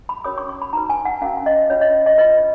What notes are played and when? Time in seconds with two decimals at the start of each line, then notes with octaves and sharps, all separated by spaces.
0.09 B5
0.24 C#4 F#4 A#4 C#5 D#6
0.38 C#6
0.49 C#6
0.62 B5
0.73 D#4 F#4 B4 A#5
0.90 G#5
1.05 F#5
1.21 C#4 F#4 A#4 F5
1.46 D#5
1.70 C#4 F4 B4 C#5
1.81 D#5
2.06 D#5
2.18 F4 B4 D#5